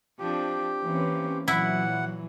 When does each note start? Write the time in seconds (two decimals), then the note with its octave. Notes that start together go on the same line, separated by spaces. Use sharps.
0.19 F3 C4 D4 G4
0.82 E3 A#3 C4 C#4
1.48 A#2 E3 F#3 E4 F#5